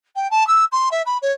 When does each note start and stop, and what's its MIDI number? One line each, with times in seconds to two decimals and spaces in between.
0.15 0.29 79
0.30 0.46 81
0.47 0.64 88
0.71 0.88 84
0.91 1.02 76
1.05 1.17 83
1.22 1.31 73